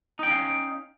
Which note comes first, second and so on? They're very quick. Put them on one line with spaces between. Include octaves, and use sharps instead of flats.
D#4 G5 C#4 F5